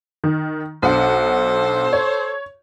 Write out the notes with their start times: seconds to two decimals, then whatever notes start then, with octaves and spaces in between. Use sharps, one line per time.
0.24 D#3
0.82 B1 D4 A4 C5 F#5
1.93 C#5